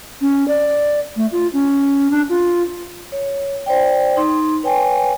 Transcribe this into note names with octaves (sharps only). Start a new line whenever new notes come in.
C#4
D5
A3
F4
C#4
D4
F4
C#5
C5 D5 G5
D#4 C6
B4 C#5 G5 G#5